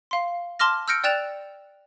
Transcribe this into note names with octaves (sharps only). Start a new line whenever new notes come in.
F5 C6
A5 C6 D6 F6 A#6
E6 F6 G6 A#6 C#7 D7
D5 G5 F#6 A6 E7 F7